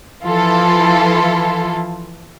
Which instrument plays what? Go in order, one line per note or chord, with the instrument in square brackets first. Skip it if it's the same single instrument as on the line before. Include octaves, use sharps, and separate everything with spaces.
[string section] E3 F3 E4 F4 A4